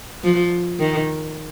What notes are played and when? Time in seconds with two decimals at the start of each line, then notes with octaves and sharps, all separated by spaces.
0.24 F3
0.79 D#3